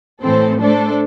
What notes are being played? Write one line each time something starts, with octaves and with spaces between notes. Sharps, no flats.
A2 E3 C4 A4 C5
A3 D4 A4 C5